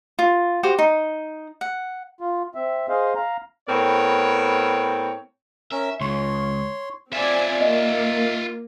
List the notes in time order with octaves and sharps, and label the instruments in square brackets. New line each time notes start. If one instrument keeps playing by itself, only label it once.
[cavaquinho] F4
F#4 G4 C5
D#4
F#5
[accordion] F4
C4 E5
G#4 C5 D#5 F5
F5 A#5
[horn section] A2 B3 C4 A#4 C#5
[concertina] C#4 A#4 [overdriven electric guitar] E5
[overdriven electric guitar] C#2 [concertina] C#5 C6
[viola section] C4 D5 G#5 [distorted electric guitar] F4 E5
[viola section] A#3 [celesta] D#5